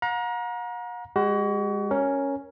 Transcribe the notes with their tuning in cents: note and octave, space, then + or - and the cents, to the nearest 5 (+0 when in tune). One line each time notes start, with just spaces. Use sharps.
F#5 -45 A#5 +30
G#3 -30 F#4 +35
C#4 +0 A#4 +0